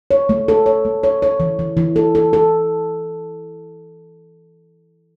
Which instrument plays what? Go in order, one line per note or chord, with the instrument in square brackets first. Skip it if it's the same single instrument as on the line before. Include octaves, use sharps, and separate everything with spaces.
[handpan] C#5
A3
A4
C#5
A3
C#5
C#5
E3
E3
E3
A4
A4
A4